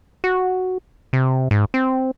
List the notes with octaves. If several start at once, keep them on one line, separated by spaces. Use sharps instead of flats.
F#4
C3
G#2
C4